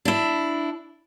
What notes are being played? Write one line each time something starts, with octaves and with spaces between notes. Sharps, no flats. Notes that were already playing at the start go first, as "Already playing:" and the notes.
D4 E4